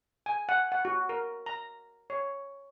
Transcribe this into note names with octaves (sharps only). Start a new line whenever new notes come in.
G#5
F#5
F#5
F#4
A#4
A#5
C#5